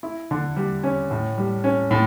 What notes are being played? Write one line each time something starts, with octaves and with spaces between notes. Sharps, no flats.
E4
D3
G3
C#4
A2
G3
C#4
A2